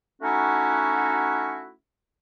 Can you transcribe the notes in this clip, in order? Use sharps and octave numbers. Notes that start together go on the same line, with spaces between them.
A3 C#4 D#4 E4 F#4